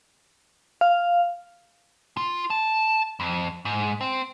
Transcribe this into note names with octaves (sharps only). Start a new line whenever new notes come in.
F5
F4
A5
F2
G#2
C4